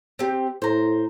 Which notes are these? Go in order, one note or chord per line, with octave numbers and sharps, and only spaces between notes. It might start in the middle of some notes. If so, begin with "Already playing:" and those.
C4 G4
A2 C5 A#5